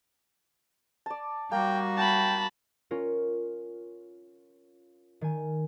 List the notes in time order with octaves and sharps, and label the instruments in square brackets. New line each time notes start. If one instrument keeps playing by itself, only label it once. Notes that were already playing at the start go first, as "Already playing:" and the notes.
[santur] D5 A5
[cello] G3 F#4 [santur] A#3 [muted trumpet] G5
[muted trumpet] G5 [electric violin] A5 B5
[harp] C#4 F4 A#4
D#3 G#5